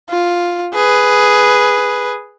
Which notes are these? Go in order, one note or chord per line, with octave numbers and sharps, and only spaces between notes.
F4
G#4 B4